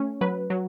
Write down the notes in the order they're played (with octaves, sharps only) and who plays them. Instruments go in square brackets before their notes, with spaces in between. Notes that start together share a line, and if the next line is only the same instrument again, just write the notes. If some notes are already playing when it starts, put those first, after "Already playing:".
Already playing: [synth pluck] A3 C#4
F#3 B4
F#3